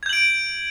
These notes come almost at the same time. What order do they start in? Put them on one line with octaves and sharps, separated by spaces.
G#6 G6 F#7 D7